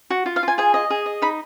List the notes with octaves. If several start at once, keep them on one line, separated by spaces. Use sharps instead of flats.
F#4
F4
F5
F4
G#5
G#4 G#5
D#5
G#4
D#5
D#4 B5